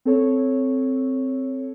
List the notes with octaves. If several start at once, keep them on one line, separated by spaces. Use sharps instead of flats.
C4 A4 C#5